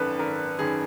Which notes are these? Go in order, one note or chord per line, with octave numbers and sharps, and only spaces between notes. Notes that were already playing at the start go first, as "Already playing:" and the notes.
Already playing: G#1 F#2 D#3 A4 B4
G#1 A#4
F#2 D#3 G#4